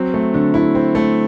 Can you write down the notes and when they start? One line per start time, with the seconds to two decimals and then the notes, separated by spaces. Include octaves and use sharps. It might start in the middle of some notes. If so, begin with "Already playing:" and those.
Already playing: F#3 C4
0.14 A3
0.34 D3
0.54 E4
0.75 C4
0.95 A3